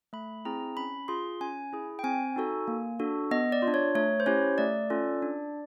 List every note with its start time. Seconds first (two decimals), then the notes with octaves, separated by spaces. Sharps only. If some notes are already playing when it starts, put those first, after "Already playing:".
0.13 A3 B5
0.45 C4 E4 G#4 A#5
0.77 C#4 B5
1.08 F4 G#4 C6
1.41 C#4 G#5
1.73 E4 G#4
1.99 G5
2.03 C4 G#5
2.36 D#4 F#4 A4
2.68 A#3
2.99 D4 F#4 A4
3.31 B3 D#5
3.52 D5
3.62 F4
3.68 D4
3.74 C#5
3.95 A3 C#5
4.20 C5
4.26 C#4 E4 G4 C#5
4.58 A3 D5
4.90 C#4 F4 A4
5.22 D4